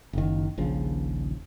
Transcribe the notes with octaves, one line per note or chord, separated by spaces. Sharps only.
F#1 D#3
D#1 A#1 C#3 F3